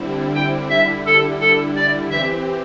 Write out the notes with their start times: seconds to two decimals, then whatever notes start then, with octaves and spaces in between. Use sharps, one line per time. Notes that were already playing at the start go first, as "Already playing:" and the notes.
Already playing: D3 G3 C4 E4
0.35 G5
0.70 D3 G3 E4 E5
1.06 A4
1.41 A4
1.76 D5
2.11 E3 C4 G4 E5